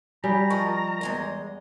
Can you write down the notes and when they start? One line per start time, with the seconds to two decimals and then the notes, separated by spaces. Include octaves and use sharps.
0.24 G3 G#5 A#5
0.50 F3 A#4 D#5 C#6
1.01 E2 G#3 D#5